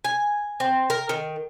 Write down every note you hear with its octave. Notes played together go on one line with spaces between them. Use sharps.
G#5
C4
A#4
D#3